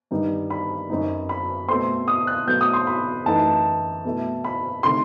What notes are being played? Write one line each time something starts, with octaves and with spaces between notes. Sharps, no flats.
G2 D#3 G3 D#4
B5
F#2 F#3 C4 D#4
B5
B2 A3 C4 C6
D#6
F#6
B2 F#3 A3 G6
D#6
C6
B5
F#2 E3 A3 D#4 A5
B2 A3 E4
B5
C3 D#3 A3 C6